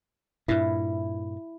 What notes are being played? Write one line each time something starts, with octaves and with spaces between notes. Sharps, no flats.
G2 A#2 E4